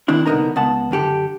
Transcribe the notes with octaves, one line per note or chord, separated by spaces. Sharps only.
D#3 A#3 C4 D4 E4
C2 D3 B3 D#4 A#4 A#5
C#2 B3 F#5 A5
F#2 D3 G4 A4